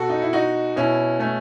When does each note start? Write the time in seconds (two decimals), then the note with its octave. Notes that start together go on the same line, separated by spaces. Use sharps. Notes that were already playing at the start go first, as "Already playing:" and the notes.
Already playing: B2 F#4 A4
0.09 D#4
0.22 E4
0.33 D#4 F#4
0.76 B2 C#4 E4
1.19 A3 C#4